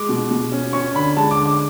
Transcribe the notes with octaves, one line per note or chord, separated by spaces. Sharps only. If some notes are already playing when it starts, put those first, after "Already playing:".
Already playing: G#3 D6
B2
B2
C#4
C#4 C#6
D3 B5
G#3 A5
D6
D3
D6